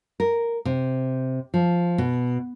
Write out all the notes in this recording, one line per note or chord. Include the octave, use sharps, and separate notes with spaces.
A#4
C3
F3
B2